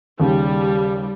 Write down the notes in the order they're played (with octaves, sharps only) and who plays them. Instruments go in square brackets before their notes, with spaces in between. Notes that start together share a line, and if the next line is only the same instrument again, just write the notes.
[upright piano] D#2 C#3 [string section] G3